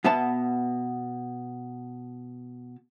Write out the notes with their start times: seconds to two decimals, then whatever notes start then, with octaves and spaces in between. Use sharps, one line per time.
0.04 B2 B3 E5 A5